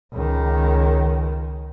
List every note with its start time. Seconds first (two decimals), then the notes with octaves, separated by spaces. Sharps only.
0.13 C#2 D#3